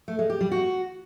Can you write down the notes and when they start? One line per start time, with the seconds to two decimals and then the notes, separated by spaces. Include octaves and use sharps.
0.08 A3
0.19 G#3
0.30 G4
0.41 G3
0.52 F#4